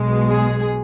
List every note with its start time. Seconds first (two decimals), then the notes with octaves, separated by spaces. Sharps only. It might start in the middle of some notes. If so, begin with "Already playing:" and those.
Already playing: B1 B2 G#3
0.28 G#4